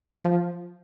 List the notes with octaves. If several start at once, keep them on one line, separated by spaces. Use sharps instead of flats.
F3